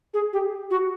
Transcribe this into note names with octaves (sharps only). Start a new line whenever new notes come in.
G#4
G4
F#4